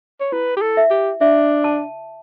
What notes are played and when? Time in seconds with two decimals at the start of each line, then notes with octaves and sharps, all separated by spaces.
0.21 C#5
0.32 E4 B4
0.57 G4
0.62 A4
0.77 E5
0.91 G4
1.21 D4 E5
1.64 A5